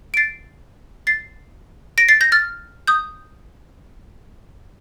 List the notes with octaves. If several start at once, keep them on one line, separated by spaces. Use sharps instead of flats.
D7
A6 C7
A6 C7
A#6 D7
A6 C7
G6 A#6
F6 A6
D#6 G6